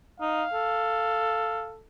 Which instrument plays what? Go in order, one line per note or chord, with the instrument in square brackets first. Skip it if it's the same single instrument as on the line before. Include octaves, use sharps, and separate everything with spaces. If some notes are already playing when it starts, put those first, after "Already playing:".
[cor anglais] D#4 [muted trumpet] F5
[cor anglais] A4